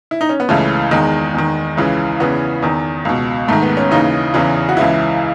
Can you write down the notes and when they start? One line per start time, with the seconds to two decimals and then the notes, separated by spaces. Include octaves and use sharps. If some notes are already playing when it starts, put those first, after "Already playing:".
0.11 E4
0.21 D#4
0.29 C#4
0.40 B3
0.49 C#2 C#3 E3 A3
0.91 E2 D#3 G#3
1.34 E2 D#3
1.77 C#2 C#3 E3
2.20 E2 C#3 E3 B3
2.62 E2 D#3
3.05 C#2 B2
3.48 G#2 D#3 A3
3.62 B3
3.77 C#4
3.91 D#2 C#3 E3 D#4
4.34 E2 C#3 E3
4.69 F#4
4.77 C#2 C#3 E3 E4